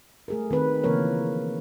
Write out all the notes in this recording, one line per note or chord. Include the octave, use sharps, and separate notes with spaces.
A3 G#4 A#4
D#3 C4 B4
C#3 E3 F3 A#3 A#4 C#5